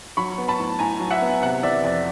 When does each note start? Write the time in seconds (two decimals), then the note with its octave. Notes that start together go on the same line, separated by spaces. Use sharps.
0.17 F#3 B5 C#6
0.38 B3
0.48 A5 B5
0.59 A2
0.79 A2 G#5 A#5
1.00 F#3
1.11 E5 F#5
1.22 B3
1.42 C3 E5 F#5
1.63 E3 D5 E5
1.84 F2 D5